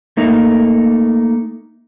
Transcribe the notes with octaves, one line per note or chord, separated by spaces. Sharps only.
A3 A#3 D#4